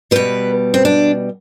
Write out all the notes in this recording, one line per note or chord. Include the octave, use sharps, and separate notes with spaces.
B2 G3 B4
C4
D4